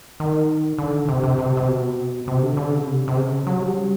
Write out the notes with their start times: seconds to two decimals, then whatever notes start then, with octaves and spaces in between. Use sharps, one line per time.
0.20 D#3
0.78 D3
1.09 C3
1.24 C3
1.38 C3
1.57 C3
1.68 B2
2.28 C3
2.43 D3
2.57 D3
2.72 C#3
2.87 C3
3.08 C3
3.17 C#3
3.47 F#3
3.61 G3